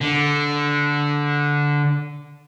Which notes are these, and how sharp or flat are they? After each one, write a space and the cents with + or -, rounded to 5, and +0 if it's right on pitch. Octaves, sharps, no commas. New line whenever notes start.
D3 -10